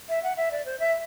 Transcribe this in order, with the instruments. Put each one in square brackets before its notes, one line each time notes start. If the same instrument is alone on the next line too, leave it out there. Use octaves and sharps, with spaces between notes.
[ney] E5
F#5
E5
D5
C5
E5